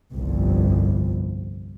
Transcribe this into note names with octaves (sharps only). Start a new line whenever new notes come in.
G1 C2 F2